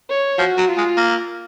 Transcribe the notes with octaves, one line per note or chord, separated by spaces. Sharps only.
C#5
F3 F#4
F#3
F4
G#3
A#3